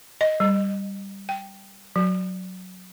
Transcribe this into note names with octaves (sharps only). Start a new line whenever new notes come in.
D#5
G3
G5
F#3